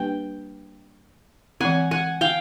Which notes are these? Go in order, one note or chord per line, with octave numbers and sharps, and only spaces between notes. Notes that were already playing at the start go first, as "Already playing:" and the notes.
Already playing: G3 A#3 D4 G4 B4 G5
E3 G#3 C4 F#5 G#5
F#5 G#5
F5 G5